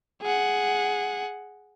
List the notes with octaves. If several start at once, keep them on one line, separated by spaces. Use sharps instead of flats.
G#4 F#5